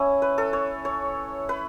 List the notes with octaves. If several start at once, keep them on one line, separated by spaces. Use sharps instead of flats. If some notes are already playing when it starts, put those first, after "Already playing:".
Already playing: C#4 E4
B4
A4
C#5
C#5
B4